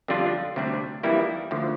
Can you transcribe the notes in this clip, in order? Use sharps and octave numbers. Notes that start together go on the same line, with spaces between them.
F2 D3 G3 D4 F4
D2 C3 G3 D4
F2 E3 G3 A#3 E4
D2 D3 F3